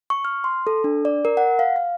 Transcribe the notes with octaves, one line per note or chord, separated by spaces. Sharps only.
C#6
F6
C6
A4
D4
D5
A#4
F#5
F5
F5